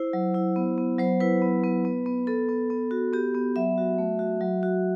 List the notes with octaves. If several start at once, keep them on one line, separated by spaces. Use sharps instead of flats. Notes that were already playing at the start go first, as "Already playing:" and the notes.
Already playing: E4 C5
F#3
E4
B3
B3
F#3 C5
E4 B4
B3
B3
B3
B3
B3 A4
B3
B3
F#4
B3 G4
B3
F#3 E5
F#4
A3
F#4
F#3
F#4